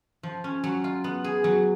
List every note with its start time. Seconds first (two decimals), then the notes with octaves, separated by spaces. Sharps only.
0.23 F3
0.44 C#4
0.64 F#3
0.84 F4
1.04 B3
1.24 G#4
1.44 F#3